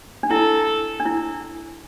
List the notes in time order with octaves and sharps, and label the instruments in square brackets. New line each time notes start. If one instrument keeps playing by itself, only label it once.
[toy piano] D4
[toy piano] E4 [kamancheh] A4
[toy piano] D4
E4